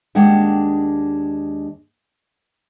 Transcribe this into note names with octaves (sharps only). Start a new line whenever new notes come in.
D#2 G#3 D4 F#5 G5